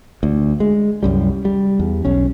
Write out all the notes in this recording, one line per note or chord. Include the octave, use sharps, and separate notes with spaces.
D2
G#3
C2 F#2 G3
G3
E2
B1 C#4